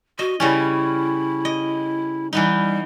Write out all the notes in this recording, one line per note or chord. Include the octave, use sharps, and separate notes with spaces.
F#4 D#5
C#3 G3 C#4 E4
D#5
E3 G3 B3 D#4